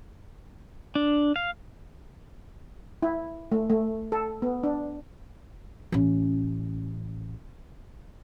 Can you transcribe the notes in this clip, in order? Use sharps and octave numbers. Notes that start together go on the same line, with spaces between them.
D4
F5
E4
A3
A3
A4
B3
D4
A1 C#4